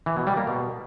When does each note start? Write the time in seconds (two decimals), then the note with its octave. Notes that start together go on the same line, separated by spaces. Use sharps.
0.06 E3
0.17 B2
0.27 G3
0.37 A#3
0.47 B2